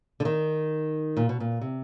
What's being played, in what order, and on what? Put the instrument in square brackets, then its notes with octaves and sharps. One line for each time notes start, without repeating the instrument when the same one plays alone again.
[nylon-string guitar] D3
D#3
A#2
B2
A#2
C3